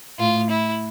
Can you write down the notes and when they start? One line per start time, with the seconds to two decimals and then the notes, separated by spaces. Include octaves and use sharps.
0.19 A2 F4
0.50 E4